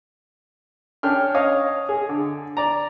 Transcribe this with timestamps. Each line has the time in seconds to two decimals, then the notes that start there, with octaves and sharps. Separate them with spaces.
1.03 C#4 D4 G5 F6
1.34 C#5 D#5 F5 D#6
1.89 G#4
2.09 D3
2.57 D5 A#5